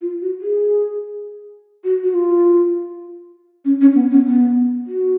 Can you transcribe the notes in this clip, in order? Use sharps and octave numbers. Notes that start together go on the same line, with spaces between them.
F4
F#4
G#4
F#4
F#4
F4
C#4
C#4
B3
C#4
B3
F#4